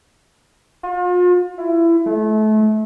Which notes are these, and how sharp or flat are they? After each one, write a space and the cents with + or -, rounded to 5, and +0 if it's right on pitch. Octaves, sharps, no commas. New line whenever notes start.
F4 +40
E4 +25
A3 -30